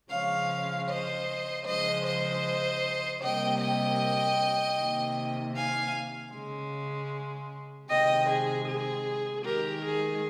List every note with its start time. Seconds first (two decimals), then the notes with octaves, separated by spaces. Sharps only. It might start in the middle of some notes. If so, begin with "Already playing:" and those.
0.11 C#3 F3 G#3 C#5 F5
0.89 C5 D#5
1.67 C#3 F3 G#3 C5 D#5
2.06 C5 D#5
3.23 C3 G3 A#3 D#5 G5
3.61 D#5 G5
4.79 C3 D#3 A#3
5.56 F5 G#5
6.34 C#3 G#3
7.89 C3 D#3 G#3 D#5 G5
8.29 G#4
8.67 G#4
9.45 D#3 G#3 G4 A#4
9.84 G#4